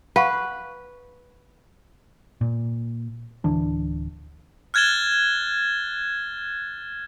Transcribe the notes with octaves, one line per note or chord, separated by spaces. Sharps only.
B4 F5 F#5 C#6
A#2
D1 D3 E3 D4
F6 F#6 G#6 A6 E7 G7